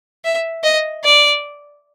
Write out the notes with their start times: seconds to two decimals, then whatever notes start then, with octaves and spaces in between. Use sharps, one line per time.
0.24 E5
0.63 D#5
1.04 D5